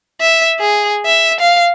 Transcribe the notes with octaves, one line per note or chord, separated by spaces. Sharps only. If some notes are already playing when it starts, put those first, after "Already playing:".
E5
G#4
E5
F5